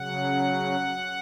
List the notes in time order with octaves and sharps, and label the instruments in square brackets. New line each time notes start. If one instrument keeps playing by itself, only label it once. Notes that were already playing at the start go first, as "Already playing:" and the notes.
Already playing: [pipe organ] C#3 F#3 F#5